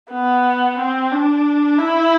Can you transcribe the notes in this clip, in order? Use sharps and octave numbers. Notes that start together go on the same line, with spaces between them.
B3
C4
D4
E4